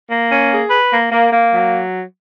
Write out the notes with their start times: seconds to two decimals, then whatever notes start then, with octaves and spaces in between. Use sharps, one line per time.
0.10 A#3
0.31 C#4
0.50 G#4
0.70 B4
0.91 A#3
1.11 A#3
1.32 A#3
1.53 F#3